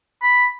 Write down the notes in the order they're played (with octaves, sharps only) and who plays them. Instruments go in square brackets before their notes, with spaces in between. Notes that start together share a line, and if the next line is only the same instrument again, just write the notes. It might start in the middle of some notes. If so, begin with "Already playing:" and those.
[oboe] B5